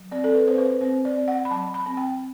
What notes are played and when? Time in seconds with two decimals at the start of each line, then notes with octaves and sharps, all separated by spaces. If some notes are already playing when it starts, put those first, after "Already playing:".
Already playing: F#3
0.11 C4 D5
0.24 A4
0.34 B4
0.47 C4 C5
0.58 B4
0.81 C4 C5
1.05 D5
1.17 C4
1.28 F#5
1.45 B5
1.51 F#3 A5
1.74 B5
1.86 C4
1.97 G5